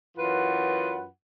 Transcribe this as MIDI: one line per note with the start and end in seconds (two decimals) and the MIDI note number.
0.18 1.05 42
0.18 1.05 52
0.18 1.05 65
0.18 1.05 71
0.18 1.05 78